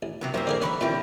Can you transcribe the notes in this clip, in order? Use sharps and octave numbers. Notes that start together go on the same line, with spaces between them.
A1
C3 F#3 B3
F#2 G3 A#3 C4 E4 C5
D3 G#4 A#4
C#4 E5 A5 B5 C#6 F#6
A#2 D3 E3 G3 C4 G4